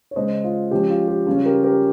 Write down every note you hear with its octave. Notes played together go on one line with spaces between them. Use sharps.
C#5
C#3 G#3 C#4 C5 D#5
F4
F3 G#3 C#4 G4
F4
G4
C#3 G3 C#4 F4 G#4
G4 A#4
G4 A#4